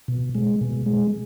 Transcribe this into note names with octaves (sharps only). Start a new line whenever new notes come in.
B2
G#3
B2
G#3